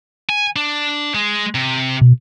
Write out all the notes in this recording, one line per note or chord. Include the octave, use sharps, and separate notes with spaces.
G#5
D4
G#3
C3
B2